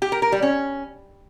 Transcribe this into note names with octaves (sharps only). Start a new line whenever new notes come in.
G4
A#4
A#4
G3
C#4